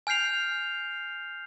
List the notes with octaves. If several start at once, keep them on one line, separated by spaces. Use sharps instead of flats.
G#5 F6 G6 C7 F7